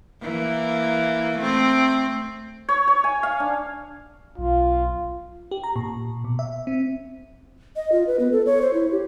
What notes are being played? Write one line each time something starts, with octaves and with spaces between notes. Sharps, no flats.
E3 A#3
A3 C4
C#5
C#5
G#5
F5
D4
B1 F4
G4
A#5
A#2
B2
E5
C4
D#5
F4
B4
B3
A4
C#5
C5
E4
G4